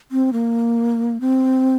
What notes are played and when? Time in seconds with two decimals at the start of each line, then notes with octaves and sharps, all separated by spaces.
0.12 C4
0.33 A#3
1.21 C4